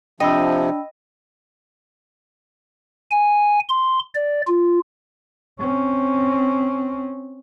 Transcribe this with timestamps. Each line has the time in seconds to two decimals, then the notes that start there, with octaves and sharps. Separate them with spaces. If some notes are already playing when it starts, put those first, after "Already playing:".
0.20 C3 F3 D4 D#5 G5 B5 E6
3.11 G#5
3.69 C6
4.15 D5
4.47 F4
5.59 C4 C#4